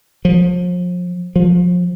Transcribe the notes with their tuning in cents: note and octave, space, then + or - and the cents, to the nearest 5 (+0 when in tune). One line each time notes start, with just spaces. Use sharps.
F3 +35
F3 +30